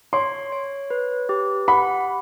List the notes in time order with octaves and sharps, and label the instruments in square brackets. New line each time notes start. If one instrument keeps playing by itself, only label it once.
[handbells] C#5 [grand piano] C6
[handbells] C#5
B4
G4
[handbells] F#5 [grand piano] B5